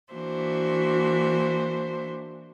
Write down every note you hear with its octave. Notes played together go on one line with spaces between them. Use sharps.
E3 A#3 D4 F#4 C5 E5